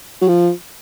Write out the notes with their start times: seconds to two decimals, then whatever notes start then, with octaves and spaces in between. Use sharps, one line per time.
0.22 F#3
0.28 F3